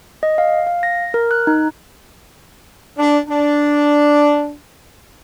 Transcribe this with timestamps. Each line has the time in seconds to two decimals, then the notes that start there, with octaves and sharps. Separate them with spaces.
0.23 D#5
0.38 F5
0.67 F5
0.83 A#6
1.14 A#4
1.31 F#6
1.47 D#4
2.98 D4
3.28 D4